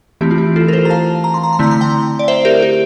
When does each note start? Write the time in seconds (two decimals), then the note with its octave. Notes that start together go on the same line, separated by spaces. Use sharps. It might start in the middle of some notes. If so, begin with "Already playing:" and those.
0.21 E3 A3 C4 E4 G4
0.31 F4
0.38 G4
0.56 F4 A4
0.68 A#4
0.73 A4 C5
0.85 A#5
0.90 F5 A5
1.24 A#5
1.34 C6
1.43 A#5
1.53 C6
1.59 D3 A3 C4 E4 A#5
1.71 C6
1.81 G5 A#5
2.19 D5
2.28 C5 E5
2.45 G4 A#4
2.62 G4